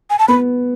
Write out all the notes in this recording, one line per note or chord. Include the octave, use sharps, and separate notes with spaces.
G#5
A5
B3 B5